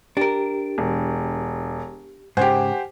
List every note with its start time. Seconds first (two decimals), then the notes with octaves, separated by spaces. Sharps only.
0.17 D4 G4 A#4
0.78 E1
2.37 G#2 C#3 G4 C5 F#5 G#5